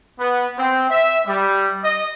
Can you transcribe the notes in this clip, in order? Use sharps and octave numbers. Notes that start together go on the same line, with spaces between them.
B3
C4
E5
G3
D#5